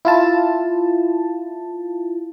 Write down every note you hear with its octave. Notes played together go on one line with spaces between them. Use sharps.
E4 F4 A5